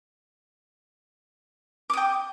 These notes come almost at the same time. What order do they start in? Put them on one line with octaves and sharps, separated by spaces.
D6 D#6 G5